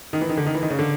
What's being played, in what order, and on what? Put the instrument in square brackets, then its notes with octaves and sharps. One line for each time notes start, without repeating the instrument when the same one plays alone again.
[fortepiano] D#3
E3
D#3
D3
D#3
E3
D#3
C#3
D3